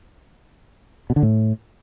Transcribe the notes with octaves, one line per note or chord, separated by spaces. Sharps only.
B2
D3
A2